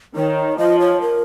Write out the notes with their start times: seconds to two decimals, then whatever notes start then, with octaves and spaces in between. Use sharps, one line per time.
0.16 D#3 C#5
0.58 F3 D#5
0.80 C#5
1.01 A#4